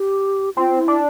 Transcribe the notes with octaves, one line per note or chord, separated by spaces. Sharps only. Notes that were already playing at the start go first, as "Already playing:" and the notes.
Already playing: G4
C4 F4
E4
D4